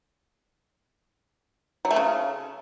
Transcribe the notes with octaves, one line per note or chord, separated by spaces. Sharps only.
F#3
A3
C#3